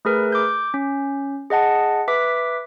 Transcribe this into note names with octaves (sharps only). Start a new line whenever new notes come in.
A3 G#4 A#4 B4
D6 G6
C#4
G#4 D#5 F#5 A5
B4 E5 D6 B6